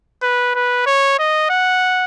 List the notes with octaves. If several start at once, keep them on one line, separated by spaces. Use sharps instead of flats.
B4
B4
C#5
D#5
F#5